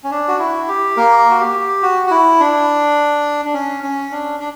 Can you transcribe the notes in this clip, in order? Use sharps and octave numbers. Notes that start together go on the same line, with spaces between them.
C#4
D4
F#4
E4
G4
A#3 A#4
F#4
G4
F#4
F#4
E4
D4
D4
C#4
C#4
D4
D4